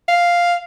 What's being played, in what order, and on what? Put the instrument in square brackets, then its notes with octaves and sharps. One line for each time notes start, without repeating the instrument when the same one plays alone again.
[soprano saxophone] F5